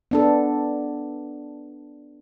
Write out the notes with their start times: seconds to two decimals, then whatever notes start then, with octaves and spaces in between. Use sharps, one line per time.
0.11 B3 D4 A4